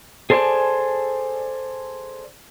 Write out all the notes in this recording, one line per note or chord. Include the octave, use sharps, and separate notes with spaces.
G#4 A4 C5 D5 G#5 A5